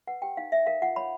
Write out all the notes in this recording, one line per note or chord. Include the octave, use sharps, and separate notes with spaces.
B4 F#5
G4 G5
D#4 F5
C#5 E5
A#4 F5
F4 F#5
C#5 B5